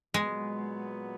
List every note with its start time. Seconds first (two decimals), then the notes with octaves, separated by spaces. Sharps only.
0.14 A#2 F#3 G#3 B3